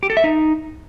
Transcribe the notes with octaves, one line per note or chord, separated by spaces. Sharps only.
G4
A4
E5
D#4